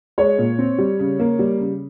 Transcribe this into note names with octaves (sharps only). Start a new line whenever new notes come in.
G#3 C#5
A#2
C4
G3
C#3
A#3
G3
C#3